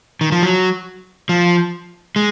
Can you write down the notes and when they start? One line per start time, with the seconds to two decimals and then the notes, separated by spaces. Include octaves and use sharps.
0.21 D#3
0.32 F3
0.43 F#3
1.29 F3
2.16 G#3